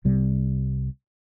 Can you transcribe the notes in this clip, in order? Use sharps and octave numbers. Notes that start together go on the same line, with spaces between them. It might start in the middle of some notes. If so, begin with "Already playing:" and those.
C2 C3 G3